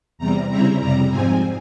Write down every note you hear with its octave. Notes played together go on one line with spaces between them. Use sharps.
E2 C3 G3 A#5
C#3 G3 C4 E4 A#5
F2 C3 G3 A#5
G#2 F3 C4 G#5